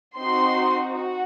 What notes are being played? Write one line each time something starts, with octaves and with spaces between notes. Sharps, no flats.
C4 D#4 F#4 C6
F#4